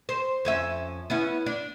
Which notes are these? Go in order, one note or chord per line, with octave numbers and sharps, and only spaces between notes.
C5
F2 C#4 E5
B3 C#4 E4
D4